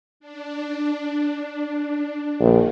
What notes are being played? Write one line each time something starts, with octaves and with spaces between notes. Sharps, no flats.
D4
A#1 D#3